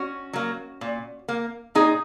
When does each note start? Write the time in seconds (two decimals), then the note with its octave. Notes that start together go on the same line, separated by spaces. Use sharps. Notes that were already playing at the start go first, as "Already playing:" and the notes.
Already playing: C#4 F#4
0.33 F#3 A#3
0.81 A#2
1.28 A#3
1.75 A#2 D#4 G#4